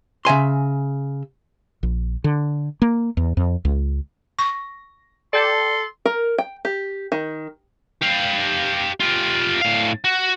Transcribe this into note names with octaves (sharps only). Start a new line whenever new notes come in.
C#3 E5 G#5 C6
A#1
D3
A#3
E2
F2
C#2
C#6 A#6
A4 D5 G5 A5 C6
A#4
G5
G4
D#3
G4 F5
F4 G4
A2 F5
F#4